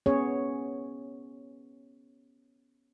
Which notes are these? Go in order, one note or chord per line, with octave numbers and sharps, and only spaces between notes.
B3 C#4 G#4 C#5